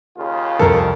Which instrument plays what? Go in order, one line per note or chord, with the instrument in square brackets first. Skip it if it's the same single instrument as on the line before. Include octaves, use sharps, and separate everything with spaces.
[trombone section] D#2 C#3 F4
[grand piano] C2 F2 [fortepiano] A4 A#4